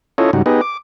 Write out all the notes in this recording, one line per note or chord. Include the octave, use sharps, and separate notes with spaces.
C#4 E4 F4 A4 C#5 D#5
G#2 C#3 G3 D#4 F#4
B3 D#4 G4 G#4 B4 D#5
D6